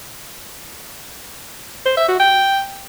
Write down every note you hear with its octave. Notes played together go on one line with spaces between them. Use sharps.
C5
E5
F#4
G5